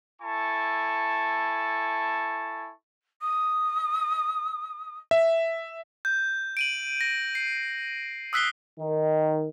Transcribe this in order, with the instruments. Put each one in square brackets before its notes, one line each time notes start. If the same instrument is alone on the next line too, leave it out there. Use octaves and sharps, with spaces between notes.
[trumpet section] E4 A4 G#5 A5 C#6
[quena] D#6
[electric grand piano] E5
[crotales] G6
D7 D#7 F#7
A#6
C7
D#6 E6 F#6 B6 C7 G7
[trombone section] D#3